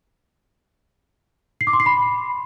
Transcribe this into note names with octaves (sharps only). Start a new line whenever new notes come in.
C7
D6
C6
C7
B5